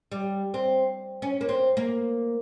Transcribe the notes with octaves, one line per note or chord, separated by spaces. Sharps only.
G3
C4
C#4
A#3
C4
A#3